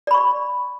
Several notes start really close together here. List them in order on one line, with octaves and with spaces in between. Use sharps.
D5 B5 C#6